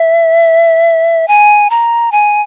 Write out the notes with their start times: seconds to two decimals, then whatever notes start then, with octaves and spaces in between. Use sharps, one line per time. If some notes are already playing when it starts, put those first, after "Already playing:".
Already playing: E5
1.28 G#5
1.70 A#5
2.12 G#5